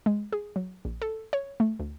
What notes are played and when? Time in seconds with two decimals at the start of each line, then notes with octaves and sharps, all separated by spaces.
0.06 G#3
0.33 G#4
0.56 F#3
0.85 A#1
1.02 A4
1.33 C#5
1.60 A3
1.79 D2